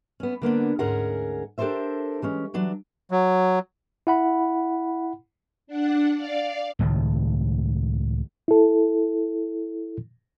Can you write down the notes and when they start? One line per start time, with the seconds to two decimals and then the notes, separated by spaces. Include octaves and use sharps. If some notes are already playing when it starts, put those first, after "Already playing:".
0.20 B3 C#4
0.42 D3 A#3 B3 D4
0.79 D2 G#2 C#4 G#4 A#4 F#5
1.58 D4 G4 A4 A#4 C5 E5
2.22 E3 G#3 C#4
2.54 E3 F#3 D4
3.11 F#3
4.07 E4 F#5 B5
5.67 D4 F#5
6.16 D5 F5
6.79 C#2 A2 D#3 A3
8.48 E4 A4